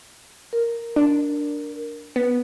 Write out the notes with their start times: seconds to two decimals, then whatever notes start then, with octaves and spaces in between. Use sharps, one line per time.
0.53 A#4
0.96 D4
2.16 B3